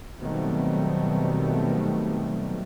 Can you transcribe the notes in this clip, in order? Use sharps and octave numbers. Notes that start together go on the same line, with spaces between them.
B2 D#3 F#3 G3 A3 C4